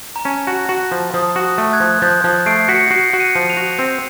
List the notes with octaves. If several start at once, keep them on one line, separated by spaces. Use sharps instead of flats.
A#5
C#4 A5
F#4
F#4
F3
F3 D#6
F#4
D#6
A3
F#6 G#6
F3
F3 G6 A6
F3
A3 C7 D7
F#4 B6 C#7
F#4 C7 D7
F#4
C#7 D#7
F3
D#7 F7
F#4
C4